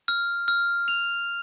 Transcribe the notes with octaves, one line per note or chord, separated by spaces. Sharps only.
F6
F6
F7